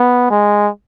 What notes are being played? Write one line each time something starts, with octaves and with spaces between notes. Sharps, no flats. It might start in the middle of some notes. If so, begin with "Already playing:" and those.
Already playing: B3
G#3